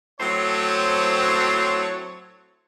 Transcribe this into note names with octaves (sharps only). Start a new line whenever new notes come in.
A2 F#3 C4 C5 C#5 A5